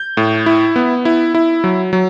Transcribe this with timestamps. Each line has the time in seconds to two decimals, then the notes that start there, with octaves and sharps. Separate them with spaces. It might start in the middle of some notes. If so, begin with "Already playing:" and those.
Already playing: G6
0.17 A2
0.46 E4
0.76 B3
1.05 E4
1.35 E4
1.64 F#3
1.93 F#3